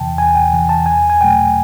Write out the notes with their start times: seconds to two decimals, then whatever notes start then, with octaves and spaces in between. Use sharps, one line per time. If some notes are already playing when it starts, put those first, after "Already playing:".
Already playing: E2 C3 E3 G5 A5
0.18 E2 G#5
0.35 G5
0.52 C3 E3
0.69 A5
0.86 E2 G#5
1.10 G#5
1.20 B2 F#3 A3 G5